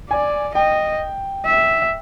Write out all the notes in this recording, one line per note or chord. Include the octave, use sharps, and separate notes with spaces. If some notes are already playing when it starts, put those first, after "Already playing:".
D5 G#5
D#5 G5
E5